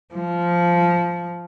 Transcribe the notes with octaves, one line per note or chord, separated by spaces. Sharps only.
F3